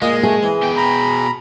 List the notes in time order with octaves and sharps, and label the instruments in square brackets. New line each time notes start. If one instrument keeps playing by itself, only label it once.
[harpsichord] A#2 A#3 F4 [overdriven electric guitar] G#3 [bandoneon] D#5
[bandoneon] A3 [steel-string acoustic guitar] G#4
[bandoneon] E3 [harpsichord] C4
[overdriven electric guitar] B2 G5
[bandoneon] A#5 B5